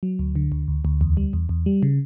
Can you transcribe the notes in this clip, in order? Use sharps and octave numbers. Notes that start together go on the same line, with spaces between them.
F#3
D2
D3
D2
D2
D2
E2
G3
E2
E2
G3
C#3